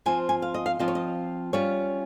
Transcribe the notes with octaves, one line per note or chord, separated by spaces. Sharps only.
F3 C4 F4 G#5
G#5
F5
D#5
F5
F3 C4 F4 D#5
C#5
D#5
G3 C#4 F4 C#5